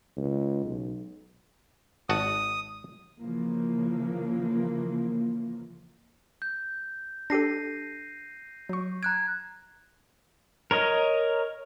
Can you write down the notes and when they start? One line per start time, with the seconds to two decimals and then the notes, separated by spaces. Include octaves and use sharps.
0.17 C#2
0.66 B1
2.09 G#1 F#4 A5 D#6
3.21 C#3 E3 F3 A#3
6.42 G6
7.30 D4 G4 A4 A#6 C7 D#7
8.69 F#3 C#6
9.03 A#5 F#6 G#6 D7
10.71 A#4 C#5 D#5